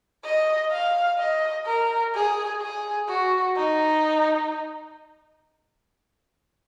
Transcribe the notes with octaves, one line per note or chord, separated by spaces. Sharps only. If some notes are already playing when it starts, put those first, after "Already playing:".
D#5
F5
D#5
A#4
G#4
G#4
F#4
D#4